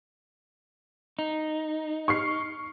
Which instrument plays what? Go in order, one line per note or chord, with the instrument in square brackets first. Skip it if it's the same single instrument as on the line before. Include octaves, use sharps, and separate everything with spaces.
[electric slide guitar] D#4
[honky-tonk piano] C#6 F6 C7